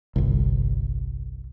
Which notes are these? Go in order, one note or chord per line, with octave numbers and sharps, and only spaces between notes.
G1 C2